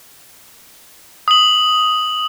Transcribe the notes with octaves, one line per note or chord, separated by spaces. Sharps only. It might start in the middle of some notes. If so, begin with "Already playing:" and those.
D#6 F#7